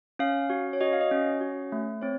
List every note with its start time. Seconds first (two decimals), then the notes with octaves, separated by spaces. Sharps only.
0.19 C#4 F5
0.50 F#4
0.73 C#5
0.81 F#4 D#5
0.93 F5
1.01 D#5
1.11 C#4
1.41 F#4
1.72 A3
2.02 C4 C#5